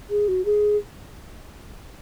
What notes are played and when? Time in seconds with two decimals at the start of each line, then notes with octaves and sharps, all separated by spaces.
0.10 G#4
0.28 F#4
0.45 G#4